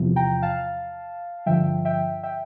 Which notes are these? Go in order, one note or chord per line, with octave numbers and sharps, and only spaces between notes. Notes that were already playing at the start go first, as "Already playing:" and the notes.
Already playing: E2 C3 F3
G5 A#5
F5 A5
G2 D3 F3 E5 G5
E5 G5
E5 G5